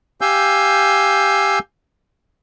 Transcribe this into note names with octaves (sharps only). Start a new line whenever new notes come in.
G4 F5 G#5 E6 G6